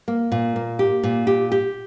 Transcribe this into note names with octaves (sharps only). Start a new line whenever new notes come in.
A#3
A#2
A#3
G4
A#2
G4
G4